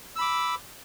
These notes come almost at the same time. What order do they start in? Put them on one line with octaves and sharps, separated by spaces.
E6 B5 D6